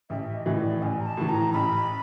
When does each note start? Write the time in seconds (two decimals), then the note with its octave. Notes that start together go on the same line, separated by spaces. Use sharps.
0.10 A1 E5
0.34 D#5
0.46 A2 E3
0.58 D5
0.82 A1 G#5
1.00 A#5
1.06 A5
1.17 A2 E3
1.29 A#5
1.53 A1 B5